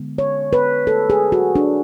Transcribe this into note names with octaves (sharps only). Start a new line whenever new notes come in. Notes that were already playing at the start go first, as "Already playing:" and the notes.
Already playing: D3 G#3 B3
C#5
B4
A4
G#4
F#4
D4